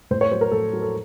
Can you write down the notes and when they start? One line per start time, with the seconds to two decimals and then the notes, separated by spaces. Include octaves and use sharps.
0.11 A2 C5
0.21 C#5
0.32 F#3 C5
0.41 A#4
0.51 A2 A4
0.73 F#3
0.82 A4